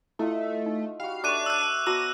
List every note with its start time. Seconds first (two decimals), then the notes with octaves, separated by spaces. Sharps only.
0.19 A3 E4 F4 D#5 E5
0.66 D#4
1.00 G3 F#4 F5
1.24 A3 D4 C#5 C#6 D6 F#6 D#7
1.46 E6 F#6
1.87 B3 F#4 C5 D5 A5 A#5 E6 A#6